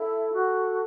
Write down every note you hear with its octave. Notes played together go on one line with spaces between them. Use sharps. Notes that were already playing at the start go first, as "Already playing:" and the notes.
Already playing: E4 A4
F#4